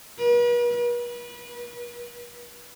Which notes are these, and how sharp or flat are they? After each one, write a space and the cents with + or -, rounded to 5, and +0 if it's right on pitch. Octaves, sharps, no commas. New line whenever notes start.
B4 -45
B4 -30